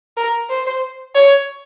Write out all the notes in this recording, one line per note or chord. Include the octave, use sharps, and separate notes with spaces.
A#4
C5
C#5